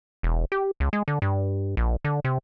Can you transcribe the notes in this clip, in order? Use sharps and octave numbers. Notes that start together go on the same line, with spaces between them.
E1
G4
C#2
G#3
D3
G2
A#1
D3
C3